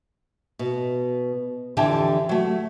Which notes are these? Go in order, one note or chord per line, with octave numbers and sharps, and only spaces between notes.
B2
F2 D3 E3 G4 G5 A5
F#3 A3